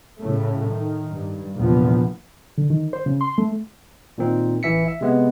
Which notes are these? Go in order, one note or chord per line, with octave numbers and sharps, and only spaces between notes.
A2 C#3 A3
D#3
G2
A#1 E2 C3 F3 B3
D3
D#3
C5
C#3
C6
A3
A#2 D#3 C4 D#4
A1 E3 E5 B6 C#7
E5
C3 G#3 B3